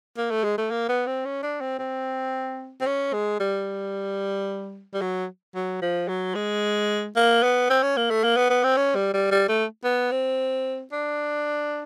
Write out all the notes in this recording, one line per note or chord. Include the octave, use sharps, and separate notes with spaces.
A#3
A3
G#3
A3
A#3
B3
C4
C#4
D4
C4
C4
C4
C#4
G#3
G3
G3
F#3
F#3
F3
F#3
G#3
A#3
B3
C4
C#4
A#3
A3
A#3
B3
B3
C4
C#4
G3
G3
G3
A3
B3
C4
D4